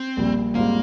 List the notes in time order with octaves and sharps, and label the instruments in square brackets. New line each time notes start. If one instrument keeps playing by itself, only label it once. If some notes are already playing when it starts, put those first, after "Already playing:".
Already playing: [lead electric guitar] C4
[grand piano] A#1 A#2 G3
[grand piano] G#2 G3 C4 F4 [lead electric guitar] A#3